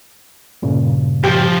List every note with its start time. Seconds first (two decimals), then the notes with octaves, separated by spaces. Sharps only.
0.62 G2 A#2 C#3
1.24 C2 F3 G4